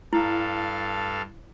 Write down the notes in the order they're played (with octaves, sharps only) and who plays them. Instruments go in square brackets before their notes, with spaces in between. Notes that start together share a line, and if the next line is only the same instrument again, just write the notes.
[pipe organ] G2 A4 F5 [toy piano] E4